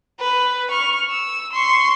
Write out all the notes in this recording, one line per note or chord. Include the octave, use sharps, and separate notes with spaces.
B4
C#6 F6
E6
C6 C#6